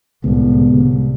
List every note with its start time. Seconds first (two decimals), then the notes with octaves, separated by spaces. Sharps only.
0.24 C2 A2 D3 G#3 B3
0.68 C2